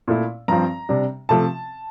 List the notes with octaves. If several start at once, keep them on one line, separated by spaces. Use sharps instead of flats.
A#2 A3 E4
G2 F3 C4 A#5
C3 G3 D4
C3 F3 A3 A5